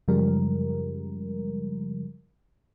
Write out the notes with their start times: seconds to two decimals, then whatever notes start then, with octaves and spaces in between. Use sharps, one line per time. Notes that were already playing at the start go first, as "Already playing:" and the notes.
0.08 F#2 C#3 F3 G3 G#3 A#4